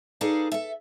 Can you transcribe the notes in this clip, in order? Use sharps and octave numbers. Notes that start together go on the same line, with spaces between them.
D#4 G#4 A4 B4 D5 F5
A4 E5